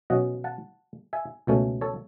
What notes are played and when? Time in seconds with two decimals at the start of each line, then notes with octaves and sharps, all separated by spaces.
0.10 B2 F#3 C#4 D#5 F#5
0.44 F#5 A5
1.13 E5 G#5
1.47 C#2 B2 A3 C#4
1.81 A4 C#5